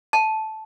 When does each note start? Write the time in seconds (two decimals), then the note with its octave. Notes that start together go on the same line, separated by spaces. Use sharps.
0.13 A5